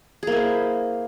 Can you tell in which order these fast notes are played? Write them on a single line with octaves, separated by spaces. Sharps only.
G#4 A#3 E4 C5